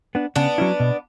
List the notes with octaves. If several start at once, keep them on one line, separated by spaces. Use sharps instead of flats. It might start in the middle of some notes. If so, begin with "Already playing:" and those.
B3 D4
C#3 B3 D4
F#3 C#4 E4
B2